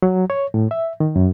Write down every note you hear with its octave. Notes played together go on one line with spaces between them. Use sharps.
F#3
C#5
A2
E5
D#3
F#2